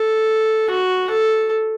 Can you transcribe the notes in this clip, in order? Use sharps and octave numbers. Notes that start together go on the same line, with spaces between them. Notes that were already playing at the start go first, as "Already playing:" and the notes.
Already playing: A4
F#4
A4